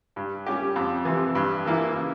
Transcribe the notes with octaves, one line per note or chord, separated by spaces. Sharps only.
G2
G3 C#4 G4
F2
C3 E3
G2
E3 A#3 E4
C#3